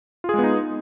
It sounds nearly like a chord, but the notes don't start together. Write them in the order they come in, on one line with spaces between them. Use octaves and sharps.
F4 G#4 G#3 B3 D#4